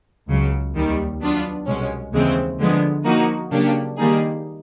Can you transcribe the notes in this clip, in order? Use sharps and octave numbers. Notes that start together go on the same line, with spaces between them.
C#2 C#3 F#3
D#2 D#3 G3
F#3 B3 D4 F4
C2 B2 G#3 C#4
D#2 C#3 E3 G#3 C4
D3 F3 G#3 B3
F3 A#3 D#4 F#4
C#3 F#3 A#3 D4 G4
D#3 G3 A#3 D#4 G#4